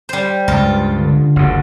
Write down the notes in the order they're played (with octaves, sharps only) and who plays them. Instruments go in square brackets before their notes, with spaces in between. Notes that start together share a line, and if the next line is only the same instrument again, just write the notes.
[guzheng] G3 C5
[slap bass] C#2 G2 [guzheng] F4
[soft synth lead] D3
[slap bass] F#1 D2 D3 [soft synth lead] F#5